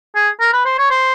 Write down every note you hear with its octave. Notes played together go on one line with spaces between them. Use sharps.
G#4
A#4
B4
C5
C#5
C5